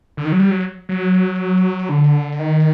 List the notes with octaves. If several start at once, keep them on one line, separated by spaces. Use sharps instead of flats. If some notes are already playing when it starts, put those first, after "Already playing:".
D3
D#3
F#3
G3
F#3
F#3
D3
D#3